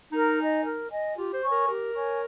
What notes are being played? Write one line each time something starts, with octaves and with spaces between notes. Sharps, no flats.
D#4 A#4
D#5 G#5
A#4
D#5 G#5
F4 G4
C5
C#5 G#5 C#6
A#4
G4 A#4
C#5 G#5 C#6